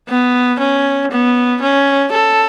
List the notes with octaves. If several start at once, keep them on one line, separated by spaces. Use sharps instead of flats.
B3
C#4
B3
C#4
A4